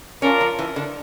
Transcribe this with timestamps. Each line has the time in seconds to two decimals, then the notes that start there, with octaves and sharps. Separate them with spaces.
0.22 C#4 D4 F4 A#4
0.41 F3
0.59 E3
0.76 D3